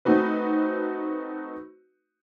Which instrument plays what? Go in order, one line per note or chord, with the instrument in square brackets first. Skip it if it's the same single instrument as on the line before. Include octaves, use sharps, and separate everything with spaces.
[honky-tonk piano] A3 C4 D#4 F#4 B4